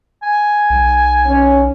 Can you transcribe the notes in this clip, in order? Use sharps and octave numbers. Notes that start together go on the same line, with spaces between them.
G#5
B1
C#4